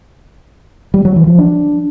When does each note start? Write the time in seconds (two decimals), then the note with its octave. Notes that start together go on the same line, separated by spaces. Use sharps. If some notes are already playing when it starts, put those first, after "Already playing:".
0.94 G3
1.05 F#3
1.16 E3
1.27 F3
1.38 D4